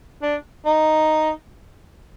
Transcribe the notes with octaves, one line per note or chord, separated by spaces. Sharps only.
D4
D#4